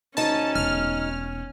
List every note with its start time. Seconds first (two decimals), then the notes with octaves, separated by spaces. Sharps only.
0.17 D2 C#4 D#4 A5
0.55 E1 F6